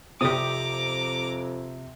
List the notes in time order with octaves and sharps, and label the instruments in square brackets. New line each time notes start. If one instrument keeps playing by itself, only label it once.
[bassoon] F2 [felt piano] C3 C4 [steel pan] G4 D#6 [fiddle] A#5 D6